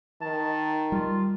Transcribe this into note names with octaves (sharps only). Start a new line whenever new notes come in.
D#3 A5
G3 F4